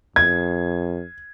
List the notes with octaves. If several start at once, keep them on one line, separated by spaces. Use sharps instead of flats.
F2 G#6